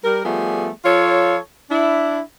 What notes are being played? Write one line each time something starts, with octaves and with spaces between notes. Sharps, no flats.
G3 A#4
F3 G3 A3 B3 G#4
F3 F4 A4 C#5
D4 E4